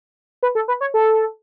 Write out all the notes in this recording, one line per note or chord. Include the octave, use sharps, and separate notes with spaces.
B4
A4
B4
C#5
A4